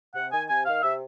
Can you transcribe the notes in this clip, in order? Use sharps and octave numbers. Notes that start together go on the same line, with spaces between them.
C3 F#5
D#3 G#5
C3 G#5
D#3 F5
C3 E5